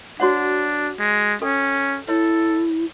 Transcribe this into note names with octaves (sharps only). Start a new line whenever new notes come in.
D4 F#4 C#5 F#5
G#3
C#4 A4 G5
E4 A4 C#5